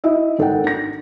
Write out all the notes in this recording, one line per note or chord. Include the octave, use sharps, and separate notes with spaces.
E4 D#5 E5
G#1 A4 A#4 F#5 G5
D4 A#6